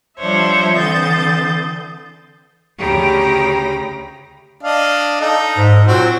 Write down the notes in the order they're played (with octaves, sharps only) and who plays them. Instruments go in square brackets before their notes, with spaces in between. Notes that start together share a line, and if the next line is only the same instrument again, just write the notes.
[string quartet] F3 G3 D4 C5 C#5 E5
D3 E3 C4 D#6 G6 A6
D2 C#3 G4 A#5 B5 A#6
[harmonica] D4 D#5 F5
D#4 A4
[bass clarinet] G#2
[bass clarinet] A#2 [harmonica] F#3 C4 F#4